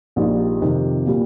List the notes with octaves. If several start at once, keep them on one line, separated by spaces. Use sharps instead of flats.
A#1 A#2 G3 D#4
F2 C3 D#3
A#2 G3